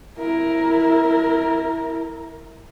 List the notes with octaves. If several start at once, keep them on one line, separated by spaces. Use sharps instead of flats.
E4 A#4